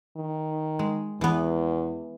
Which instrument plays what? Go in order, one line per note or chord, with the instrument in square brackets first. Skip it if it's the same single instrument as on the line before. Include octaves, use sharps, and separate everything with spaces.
[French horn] D#3
[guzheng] G#3
[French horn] E2 [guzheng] E3 B3